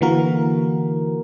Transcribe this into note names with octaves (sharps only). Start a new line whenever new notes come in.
D3 E3 A#3 F#4 A#4